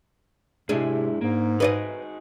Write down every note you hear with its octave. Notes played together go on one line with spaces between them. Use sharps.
G#2 C3 G#3 D4 E4 G#4
G#2 A#3
D#4 F#4 G#4 B4 D5 D#5